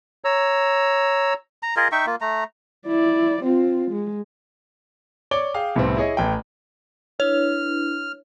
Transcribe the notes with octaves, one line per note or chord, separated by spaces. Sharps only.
C#5 A#5 E6
A#5
F4 G#4 A#4 D#5
D#4 E5 G5 C#6
A#3 F4
A3 A#5
E4 D5
C4 F4
G#3
C#5 D5 D6 G7
G#4 F5 G5
C2 A2 D#3 G3 B3 C4
E4 G#4 C#5 D#5
A1 A3 G5
D4 E4 B4 C#5 F6